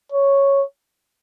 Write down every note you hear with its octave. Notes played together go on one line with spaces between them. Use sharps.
C#5